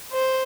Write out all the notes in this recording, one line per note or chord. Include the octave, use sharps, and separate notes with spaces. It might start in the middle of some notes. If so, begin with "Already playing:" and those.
C5